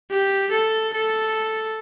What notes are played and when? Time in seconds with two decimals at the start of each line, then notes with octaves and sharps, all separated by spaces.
0.11 G4
0.51 A4
0.94 A4